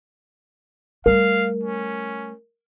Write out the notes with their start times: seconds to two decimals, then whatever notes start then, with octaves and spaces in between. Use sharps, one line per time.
1.06 G3 A3 A#4 F5
1.63 C#4